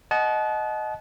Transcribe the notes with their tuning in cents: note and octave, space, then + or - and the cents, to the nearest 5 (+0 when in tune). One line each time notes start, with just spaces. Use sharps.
D#5 +0 F#5 +0 A5 -35